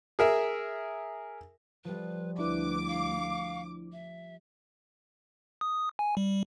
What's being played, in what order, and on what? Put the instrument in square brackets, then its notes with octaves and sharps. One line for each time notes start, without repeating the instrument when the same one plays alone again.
[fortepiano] G#4 A#4 E5
[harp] F3 G3 [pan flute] B4
[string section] D2 D6 [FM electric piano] D4 E4 [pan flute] B4
[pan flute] F5
E5
[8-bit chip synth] D#6
G#5
G3